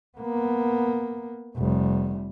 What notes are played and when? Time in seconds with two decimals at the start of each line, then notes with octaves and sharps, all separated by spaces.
0.18 A#3 B3
1.57 F1 G3